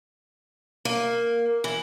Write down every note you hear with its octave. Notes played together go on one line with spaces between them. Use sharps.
A#3
E3